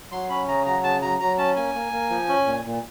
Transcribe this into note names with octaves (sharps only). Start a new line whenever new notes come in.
F#3 C6
C#4 B5
C#3 A#5
F#3 A#5
C#3 A5
F#3 A#5
F#3 A#5
C#4 A5
A#3 G#5
A#3
A#3
F3
C#4
A#2
A#2